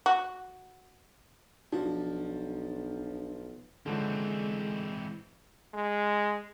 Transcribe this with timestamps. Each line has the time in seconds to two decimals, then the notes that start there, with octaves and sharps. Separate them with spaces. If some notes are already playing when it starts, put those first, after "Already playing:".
0.06 F#4
1.72 B1 F3 D4 F#4
3.86 D3 E3 F3 G#3 C4 C#4
5.73 G#3